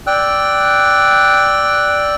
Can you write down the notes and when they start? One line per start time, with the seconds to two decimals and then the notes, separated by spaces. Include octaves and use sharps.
0.07 D5 G5 E6 F#6